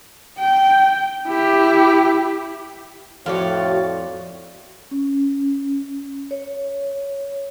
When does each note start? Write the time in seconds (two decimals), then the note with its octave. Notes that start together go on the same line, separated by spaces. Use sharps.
0.38 G5
1.27 E4 G4
3.26 F2 A2 F#4 C#5 D5 F5
4.91 C#4
6.31 C#5